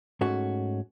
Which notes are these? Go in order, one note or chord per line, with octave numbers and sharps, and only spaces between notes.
G#2 A3 C#4 F#4